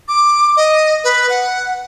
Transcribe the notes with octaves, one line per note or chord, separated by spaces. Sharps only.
D6
D#5
B4
F#5